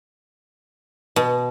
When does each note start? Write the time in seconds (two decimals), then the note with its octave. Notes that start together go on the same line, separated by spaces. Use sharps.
1.16 B2